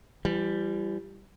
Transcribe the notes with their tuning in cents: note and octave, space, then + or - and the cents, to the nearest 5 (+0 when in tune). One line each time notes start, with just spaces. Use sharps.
E3 +40 G3 +0